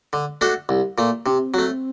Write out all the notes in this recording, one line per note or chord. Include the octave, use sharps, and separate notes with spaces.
D3
A3 D4 F#4 A4
C2
A#2 A3
C3 C4 D4
F#3 A3